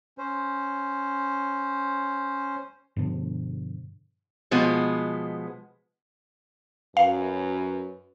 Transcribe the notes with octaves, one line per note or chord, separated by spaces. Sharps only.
C#4 C5
G2 B2 D3 F3
B2 F3 G#3 B3
F#2 B4 F5